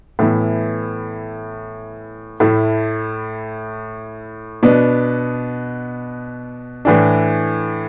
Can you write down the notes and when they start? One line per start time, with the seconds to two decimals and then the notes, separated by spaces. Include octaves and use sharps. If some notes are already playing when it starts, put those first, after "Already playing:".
0.19 A2 E3 B3 E4
2.40 A2 A3 E4
4.63 B2 B3 D4
6.85 A2 E3 D4